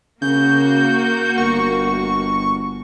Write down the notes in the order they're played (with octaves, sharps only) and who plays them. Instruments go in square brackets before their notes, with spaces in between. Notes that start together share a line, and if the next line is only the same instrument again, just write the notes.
[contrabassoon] C#3 [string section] A#3 F#4 [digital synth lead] G6
[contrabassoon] G1 [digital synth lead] C#6